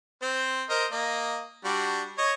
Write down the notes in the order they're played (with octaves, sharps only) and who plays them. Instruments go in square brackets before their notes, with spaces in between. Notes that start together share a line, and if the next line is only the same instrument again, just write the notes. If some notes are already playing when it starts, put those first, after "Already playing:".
[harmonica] C4 C5
A#4 C5 D#5
A#3 D#5
G3 D4 F#4
C#5 D#5